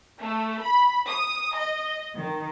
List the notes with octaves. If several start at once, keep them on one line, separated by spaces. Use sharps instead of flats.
A3
B5
D#6
D#5
D#3